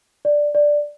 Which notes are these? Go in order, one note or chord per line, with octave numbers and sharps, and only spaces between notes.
D5
D5